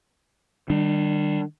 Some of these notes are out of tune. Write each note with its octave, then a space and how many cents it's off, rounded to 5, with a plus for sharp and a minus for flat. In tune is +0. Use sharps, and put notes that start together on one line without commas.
D#3 -30 G3 +0 D4 +20